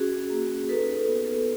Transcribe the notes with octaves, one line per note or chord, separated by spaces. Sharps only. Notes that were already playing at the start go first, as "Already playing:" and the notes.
Already playing: C#4 F#4 G#4
A#3
D#4 A4 B4
B3